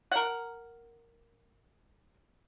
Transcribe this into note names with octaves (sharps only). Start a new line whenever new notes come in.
A#4 F#5